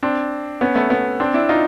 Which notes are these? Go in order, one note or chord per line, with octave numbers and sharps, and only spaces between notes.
C4 D4
B3 C#4
A3 B3
B3 C#4
C4 D4
D4 E4
D#4 F4